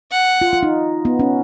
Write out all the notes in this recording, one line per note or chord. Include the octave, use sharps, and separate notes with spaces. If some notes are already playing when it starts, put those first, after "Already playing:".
F#5
F4
F4
D#4
B3
C#4